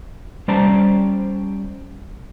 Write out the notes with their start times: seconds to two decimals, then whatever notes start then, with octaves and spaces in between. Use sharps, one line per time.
0.48 G3 C#4 C5 D5 A5 A#5